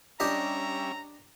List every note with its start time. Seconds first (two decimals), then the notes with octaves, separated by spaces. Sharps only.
0.20 G3 C#4 D4 G4 D#5 E5 A#5